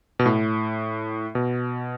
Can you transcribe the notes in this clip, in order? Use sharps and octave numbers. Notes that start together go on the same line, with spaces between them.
B2
A2
B2